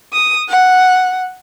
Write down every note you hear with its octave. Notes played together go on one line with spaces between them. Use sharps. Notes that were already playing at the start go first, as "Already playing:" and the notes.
D#6
F#5